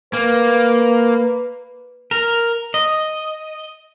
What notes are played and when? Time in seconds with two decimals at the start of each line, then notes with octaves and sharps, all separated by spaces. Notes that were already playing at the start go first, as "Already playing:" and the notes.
0.13 A#3 B4
2.11 A#4
2.74 D#5